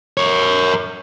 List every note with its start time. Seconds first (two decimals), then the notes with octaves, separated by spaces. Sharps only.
0.17 A#4 C#5